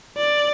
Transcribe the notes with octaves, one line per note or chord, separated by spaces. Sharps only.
D5